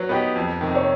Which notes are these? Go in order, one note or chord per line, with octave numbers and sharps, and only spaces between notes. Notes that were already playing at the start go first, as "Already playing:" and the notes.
Already playing: F#3 B4 C#5
B3 D#4 G4
F2
C3 D#3
C#5